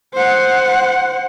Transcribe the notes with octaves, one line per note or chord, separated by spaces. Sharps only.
C5 F#5